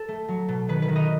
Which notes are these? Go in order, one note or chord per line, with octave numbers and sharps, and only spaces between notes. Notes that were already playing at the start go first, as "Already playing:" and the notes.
Already playing: A4
A3
F#3
B2
D#3 B4
B4
D#3
D#5